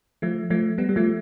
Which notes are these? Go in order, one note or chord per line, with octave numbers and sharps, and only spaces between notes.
F3 A3
F3 A3
G3 B3
G3
F3 A3